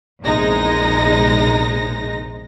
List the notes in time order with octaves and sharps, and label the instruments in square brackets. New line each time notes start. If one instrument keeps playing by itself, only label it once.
[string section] A#1 E2 C3 G#3 D#4 A#6